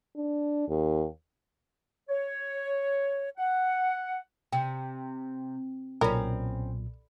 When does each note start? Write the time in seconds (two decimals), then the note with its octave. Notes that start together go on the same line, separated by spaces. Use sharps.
0.16 D4
0.69 D#2
2.09 C#5
3.37 F#5
4.53 C3 G5
6.01 B1 A#2 C4 C#4 A4 A#4 D5 B5